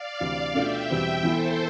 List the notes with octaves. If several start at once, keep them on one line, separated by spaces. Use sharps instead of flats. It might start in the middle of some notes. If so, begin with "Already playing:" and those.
Already playing: D5 F5
D2 C3 E3
B2 A3 D4 F4 E5 G5
E2 B2 G3 C4
E3 B3 E4 A4 C5